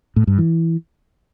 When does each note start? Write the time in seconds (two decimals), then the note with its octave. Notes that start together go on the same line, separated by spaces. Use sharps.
0.16 A2
0.27 G2
0.38 E3